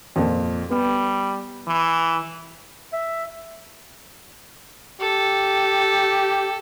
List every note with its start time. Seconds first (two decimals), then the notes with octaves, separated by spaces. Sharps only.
0.16 F2 A#2
0.70 G3 B3
1.67 E3
2.93 E5
5.01 G4 A4